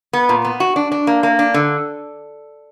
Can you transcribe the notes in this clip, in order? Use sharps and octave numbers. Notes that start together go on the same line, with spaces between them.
B3
A#2
B3
F#4
D4
D4
A#3
A#3
D4
D3